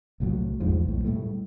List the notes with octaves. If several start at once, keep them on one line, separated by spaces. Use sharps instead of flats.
C2 A2 F3 F#3
A1 E2 G#2 F3
B1 A2
A2 G3 A3